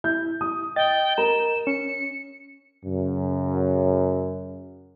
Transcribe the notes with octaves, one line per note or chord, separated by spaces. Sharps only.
E4 G6
D#6
D#5 G5 A6
A#4 A#5 E7
C#4 C#7
F#2 C#3